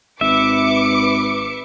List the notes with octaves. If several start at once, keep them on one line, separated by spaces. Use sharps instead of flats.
G#1 B4 E5 D6 C#7